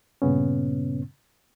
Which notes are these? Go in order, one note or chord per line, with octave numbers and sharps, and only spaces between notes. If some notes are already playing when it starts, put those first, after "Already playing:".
G2 A#2 C#3 B3 C#4